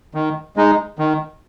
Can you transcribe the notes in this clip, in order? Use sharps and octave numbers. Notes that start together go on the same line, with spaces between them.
D#3
G#3 D#4
D#3